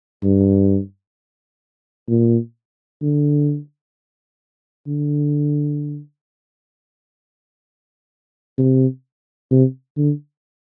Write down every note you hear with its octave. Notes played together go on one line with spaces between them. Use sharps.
G2
A#2
D3
D3
C3
C3
D3